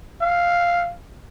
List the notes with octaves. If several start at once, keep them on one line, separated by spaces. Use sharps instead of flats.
F5